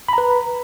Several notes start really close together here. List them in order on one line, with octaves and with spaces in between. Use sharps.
B5 A#5 B4